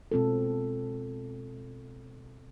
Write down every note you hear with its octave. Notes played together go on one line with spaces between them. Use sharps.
B2 G#3 C4 F4 A4